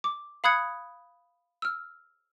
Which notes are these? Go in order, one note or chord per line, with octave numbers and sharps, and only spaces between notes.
D6
F5 B5 D#6 F#6 G#6 C#7
E6 F6